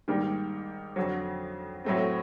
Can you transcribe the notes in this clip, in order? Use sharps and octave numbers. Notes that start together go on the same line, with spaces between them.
G#2 D#3 G3 A#3
F2 D3 F#3
A2 F#3 A3 C4